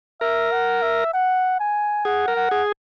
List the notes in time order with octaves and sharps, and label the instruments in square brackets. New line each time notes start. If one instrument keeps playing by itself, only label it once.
[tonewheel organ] A#4 [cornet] E5
[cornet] F#5
E5
F#5
G#5
[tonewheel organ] G#4 [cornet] F#5
[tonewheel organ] A#4
[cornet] F#5
[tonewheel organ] G#4